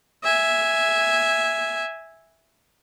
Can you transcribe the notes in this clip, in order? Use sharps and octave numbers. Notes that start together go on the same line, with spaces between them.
E5 G#5